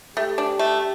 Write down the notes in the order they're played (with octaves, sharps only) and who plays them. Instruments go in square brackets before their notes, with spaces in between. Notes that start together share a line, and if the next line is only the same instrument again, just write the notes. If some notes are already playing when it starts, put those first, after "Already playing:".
[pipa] A3 [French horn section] G4
[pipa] D4
A3